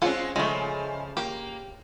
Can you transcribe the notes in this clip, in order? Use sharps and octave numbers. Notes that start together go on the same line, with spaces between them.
G#3 C4 C#4 F4 F#5
C#3 F3 G#3 A3
A#3 G4